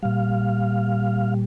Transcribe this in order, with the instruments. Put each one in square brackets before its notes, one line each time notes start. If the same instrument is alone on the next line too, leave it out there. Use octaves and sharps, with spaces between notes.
[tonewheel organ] A#2 G3 F5